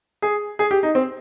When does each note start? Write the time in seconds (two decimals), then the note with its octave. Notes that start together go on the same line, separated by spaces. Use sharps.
0.22 G#4
0.59 G#4
0.71 G4
0.83 D#4
0.95 C4